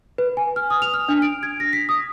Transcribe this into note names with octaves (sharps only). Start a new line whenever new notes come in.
B4
G#5
F6
D#6
F7
F6
D4
D7
G#6
A#6
B6
D#6